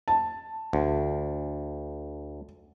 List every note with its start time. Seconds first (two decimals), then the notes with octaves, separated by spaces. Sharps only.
0.08 A5
0.73 D2